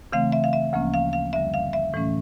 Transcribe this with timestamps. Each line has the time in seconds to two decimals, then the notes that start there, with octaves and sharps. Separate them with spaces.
0.12 C#3 E3 A3 C4 F5
0.32 E5
0.44 F5
0.53 E5
0.73 D2 C#3 F3 A#3 C#4
0.94 F5
1.13 F5
1.33 F#2 D3 G3 E5
1.54 F5
1.73 E5
1.94 A2 E3 A3 C#4